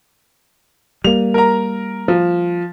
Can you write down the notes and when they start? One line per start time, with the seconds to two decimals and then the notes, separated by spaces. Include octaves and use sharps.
1.04 G3 A#3 F7
1.34 A#4 A#5
2.08 F3